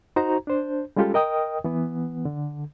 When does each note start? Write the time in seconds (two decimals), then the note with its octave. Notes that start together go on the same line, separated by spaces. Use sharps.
0.16 D#4 F#4 C5 A#5
0.47 D4 C5
0.96 G3 G#3 C#4 F4 G4 A4
1.14 A#4 D#5 G5 D#6
1.64 E3 B3
2.25 D3